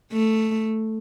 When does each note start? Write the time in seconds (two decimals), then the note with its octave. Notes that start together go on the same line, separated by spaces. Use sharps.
0.13 A3